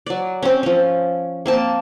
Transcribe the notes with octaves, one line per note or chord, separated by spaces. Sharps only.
F#3 D5
C4 C#4
F3 C#4
A#3 C4 A5